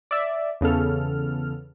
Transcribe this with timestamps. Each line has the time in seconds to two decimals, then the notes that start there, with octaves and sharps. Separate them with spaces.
0.11 D5 E5
0.61 E2 C#3 B3 A4 F6